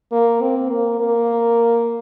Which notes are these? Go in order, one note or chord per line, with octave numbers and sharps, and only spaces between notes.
A#3
C4
A#3
A#3